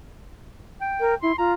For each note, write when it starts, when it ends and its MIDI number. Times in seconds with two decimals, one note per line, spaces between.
0.81 1.15 79
1.00 1.15 70
1.23 1.32 64
1.23 1.36 84
1.38 1.54 65
1.38 1.53 82